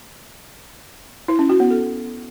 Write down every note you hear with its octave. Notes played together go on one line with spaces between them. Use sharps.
E4
C#4
F#4
B3
A4